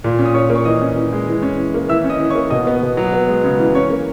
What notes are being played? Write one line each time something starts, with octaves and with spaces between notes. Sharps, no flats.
A#2
C#4
D#6
A#2 C#5 C#6
A#3
C#6
E3 D#5 D#6
C#4
E3
G#3
E3
C#4
E3
A#3
E3 E5 E6
C#4
D#5 D#6
E3
C#5 C#6
A#3
B2 D#5 D#6
B3
B2
F#3
B3
G#3
C#3
E3
C#4 C#5 C#6
A#3